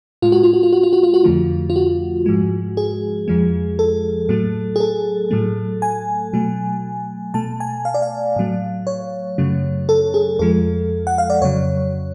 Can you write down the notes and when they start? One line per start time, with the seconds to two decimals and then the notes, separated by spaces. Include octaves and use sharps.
0.22 A2 G#3 F4
0.32 F#4
0.43 F4
0.53 F#4
0.63 F4
0.72 F#4
0.83 F4
0.93 F#4
1.03 F4
1.14 F#4
1.23 F2 D3 F3 A3 F4
1.70 F4
1.76 F#4
2.26 G#2 F3 G#3
2.77 G#4
3.28 F2 F3 G#3
3.79 A4
4.29 A2 F#3 A3
4.76 G#4
4.80 A4
5.31 A2 F#3 A3
5.82 G#5
6.34 B2 F#3 A3
7.34 B2 A3 A5
7.60 G#5
7.85 F5
7.94 D5
8.02 F5
8.36 A2 F#3 A3
8.87 C#5
9.38 F#2 C#3 F#3 A3
9.89 A4
10.14 G#4
10.39 F2 F3 G#3 A4
11.07 F#5
11.18 F5
11.30 D5
11.42 F2 C#3 F#3 C#5